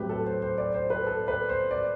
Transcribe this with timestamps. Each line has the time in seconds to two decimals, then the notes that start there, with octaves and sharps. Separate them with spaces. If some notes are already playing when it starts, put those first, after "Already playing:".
Already playing: A2 F#3 A3 C4 G4 B4
0.09 A4
0.26 C5
0.42 C5
0.58 D5
0.74 C5
0.90 B4
1.07 A4
1.28 B4
1.49 C5
1.71 D5